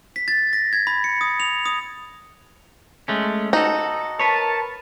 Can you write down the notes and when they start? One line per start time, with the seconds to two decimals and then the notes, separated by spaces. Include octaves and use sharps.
0.16 B6
0.28 A6
0.53 A#6
0.73 G#6
0.87 B5
1.04 C#7
1.21 D#6
1.40 F7
1.65 D#6
3.08 G#3 A3 C#4
3.53 D#4 F#4 A4
4.20 A#4 B4 C#5 A5